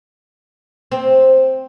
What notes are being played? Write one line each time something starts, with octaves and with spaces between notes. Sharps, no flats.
C4